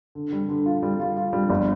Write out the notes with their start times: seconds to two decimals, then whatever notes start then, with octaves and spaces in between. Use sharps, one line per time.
0.15 D3
0.33 G3
0.49 D3
0.66 F4
0.83 G3
1.00 F4
1.17 F4
1.33 G3
1.50 G1